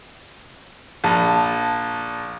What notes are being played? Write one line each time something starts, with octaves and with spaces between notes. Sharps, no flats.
A#1 A5 A#5